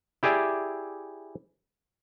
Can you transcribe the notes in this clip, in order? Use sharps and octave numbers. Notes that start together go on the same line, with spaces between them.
E4 G4 G#4 D5 E5